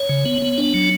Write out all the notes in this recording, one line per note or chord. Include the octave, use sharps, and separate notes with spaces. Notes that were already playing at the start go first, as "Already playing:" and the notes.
Already playing: C#5
C#3
B3
B3
D4
F#3